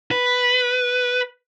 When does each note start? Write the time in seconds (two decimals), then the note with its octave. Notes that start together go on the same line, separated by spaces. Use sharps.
0.11 B4